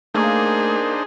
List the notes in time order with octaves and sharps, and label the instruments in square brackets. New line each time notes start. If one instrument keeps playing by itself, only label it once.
[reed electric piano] A3 [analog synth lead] A#3 [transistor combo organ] D4 D#4 C5 [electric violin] G#4